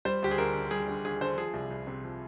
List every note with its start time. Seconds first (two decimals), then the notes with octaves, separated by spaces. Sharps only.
0.05 G3 C5
0.22 D2 G4
0.31 G#4
0.38 D2 A#4
0.55 D3
0.71 G3 G#4
0.88 D2
1.05 D2 G#4
1.21 D3 C5
1.37 F3 G#4
1.54 C2
1.71 C2
1.87 C3
2.04 F3